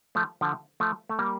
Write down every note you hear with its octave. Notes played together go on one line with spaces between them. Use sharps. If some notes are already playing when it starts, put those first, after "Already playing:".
F3 A3
D3 F3
F3 A3
A3
G3 A#3